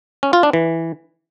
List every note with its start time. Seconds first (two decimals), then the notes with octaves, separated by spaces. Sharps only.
0.23 C#4
0.33 F4
0.43 D4
0.53 E3